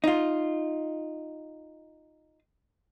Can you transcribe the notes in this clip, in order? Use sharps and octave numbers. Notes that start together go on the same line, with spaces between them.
D#4 F4